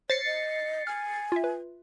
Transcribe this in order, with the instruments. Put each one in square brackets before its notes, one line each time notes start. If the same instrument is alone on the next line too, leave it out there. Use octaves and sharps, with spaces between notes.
[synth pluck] C5 A#6 [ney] C#5 [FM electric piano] A6 C7 C#7
[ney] D#5
[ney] G#5 [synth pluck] F6
[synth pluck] F4 E5
B4